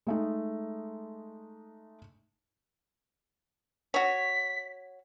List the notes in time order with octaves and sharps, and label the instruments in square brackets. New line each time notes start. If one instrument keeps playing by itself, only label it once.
[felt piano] G#3 A3 D#4
[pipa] F#4 C#5 [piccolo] B6